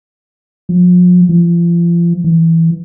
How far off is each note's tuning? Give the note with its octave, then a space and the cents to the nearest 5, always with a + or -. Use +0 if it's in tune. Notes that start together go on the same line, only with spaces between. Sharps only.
F3 +40
F3 -35
E3 -5